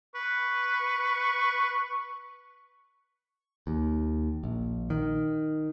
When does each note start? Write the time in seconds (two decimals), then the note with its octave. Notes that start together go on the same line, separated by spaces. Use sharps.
0.15 B4 C#6
3.67 D#2
4.44 A#1
4.90 D#3